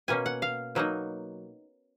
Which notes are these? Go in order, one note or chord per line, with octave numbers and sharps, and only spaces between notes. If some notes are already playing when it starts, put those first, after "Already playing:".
B2 A#3 C#4 G#5
F#5
F5
B2 F#3 A#3 D#4